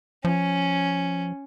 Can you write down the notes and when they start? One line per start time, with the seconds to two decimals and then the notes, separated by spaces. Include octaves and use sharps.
0.25 F3 C#4